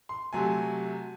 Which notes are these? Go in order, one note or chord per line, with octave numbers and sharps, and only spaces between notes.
C6
C3 F#3 A3 G#5